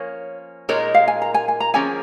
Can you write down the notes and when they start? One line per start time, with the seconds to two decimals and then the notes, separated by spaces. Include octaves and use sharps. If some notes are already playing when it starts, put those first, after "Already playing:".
Already playing: F3 A#3 C#4 C#5
0.69 A#2 G#3 D#4 A#4 C#5
0.94 F5
1.08 G#5
1.22 A#5
1.34 G#5
1.48 G#5
1.60 A#5
1.74 F3 A#3 C#4 G#4 G#5